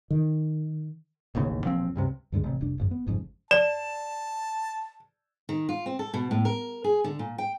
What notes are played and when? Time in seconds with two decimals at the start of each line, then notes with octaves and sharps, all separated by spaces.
0.10 D#3
1.35 E1 A1 D#2 C#3
1.63 E1 A#2 F3 C4
1.96 C#2 G2 C3
2.32 D2 G2 D3 G#3
2.44 A1 C3
2.61 F1 C2 D4
2.78 D1 G#1 F#2
2.91 B3
3.07 G#1 F2 G#2 C#3
3.51 D5 A5 E7
5.49 D#3
5.69 F4
5.86 C4
5.99 A4
6.14 B2
6.31 A2
6.45 A#4
6.84 G#4
7.04 D3
7.19 A#2
7.38 G5